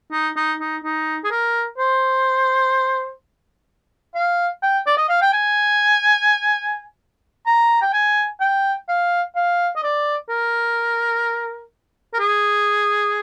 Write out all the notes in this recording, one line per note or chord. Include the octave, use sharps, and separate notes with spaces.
D#4
D#4
D#4
D#4
G#4
A#4
C5
F5
G5
D5
D#5
F5
G5
G#5
A#5
G5
G#5
G5
F5
F5
D#5
D5
A#4
A#4
G#4